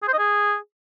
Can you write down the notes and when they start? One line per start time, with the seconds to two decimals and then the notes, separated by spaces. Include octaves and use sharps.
0.03 G#4
0.08 C5
0.13 D#5
0.19 G#4